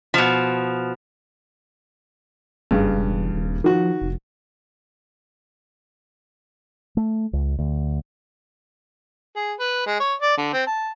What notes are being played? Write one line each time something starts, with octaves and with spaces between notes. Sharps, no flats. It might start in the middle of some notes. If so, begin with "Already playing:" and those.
B2 F3
F#1 G2 C#3
E1
D#1
D#3 F3 F#4
F1
A3
C#2
D2
G#4
B4
G#3
C#5
D5
D3
C4
A5